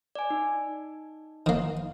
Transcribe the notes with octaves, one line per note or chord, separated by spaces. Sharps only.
D5 G#5
D#4
D#3 A#3